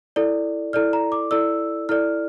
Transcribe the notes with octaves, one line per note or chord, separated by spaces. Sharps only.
E4 A4 D5
E4 A4 D5 F6
A#5
D6
E4 A4 D5 E6
E4 A4 D5 F6